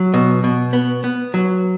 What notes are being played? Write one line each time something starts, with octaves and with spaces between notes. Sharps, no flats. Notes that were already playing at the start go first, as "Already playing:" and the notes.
Already playing: F#3
B2
B2
B3
B3
F#3